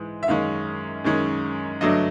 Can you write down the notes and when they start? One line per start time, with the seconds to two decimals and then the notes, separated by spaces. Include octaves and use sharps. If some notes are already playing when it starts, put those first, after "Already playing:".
Already playing: G#2 E3 G#3
0.23 E5
0.28 F#2 D#3 G#3 C#4 F5
1.04 F#2 D#3 G#3 C#4
1.81 G2 D3 F#3 A3 D4 D#5